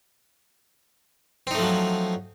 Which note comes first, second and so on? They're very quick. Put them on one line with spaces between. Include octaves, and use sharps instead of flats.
C4 D#4 A3 F3 F#3